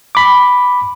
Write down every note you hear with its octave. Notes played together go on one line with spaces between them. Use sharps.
B5 D6